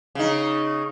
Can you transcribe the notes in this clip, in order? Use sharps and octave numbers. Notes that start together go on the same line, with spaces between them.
C#3 D#4